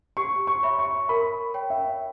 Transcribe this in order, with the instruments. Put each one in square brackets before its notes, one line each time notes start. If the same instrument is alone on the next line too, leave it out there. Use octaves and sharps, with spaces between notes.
[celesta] G4 [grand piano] C#6
[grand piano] C#6
[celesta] C#5 E5 B5
[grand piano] C#6
[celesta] A#4 [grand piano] B5
[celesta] C#5 G5
[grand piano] E5